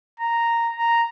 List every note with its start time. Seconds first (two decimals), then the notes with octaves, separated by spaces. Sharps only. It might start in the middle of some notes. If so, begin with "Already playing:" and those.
0.20 A#5
0.76 A#5